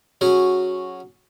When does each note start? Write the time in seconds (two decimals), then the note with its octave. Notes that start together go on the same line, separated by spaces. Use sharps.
0.21 F#3 C#4 F#4 G#4